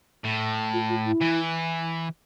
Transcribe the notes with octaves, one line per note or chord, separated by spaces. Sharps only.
A2
F4
F4
E4
E3